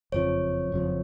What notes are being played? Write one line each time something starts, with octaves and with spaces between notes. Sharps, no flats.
F#1 F2 F3 C#5
F#1 F2 F3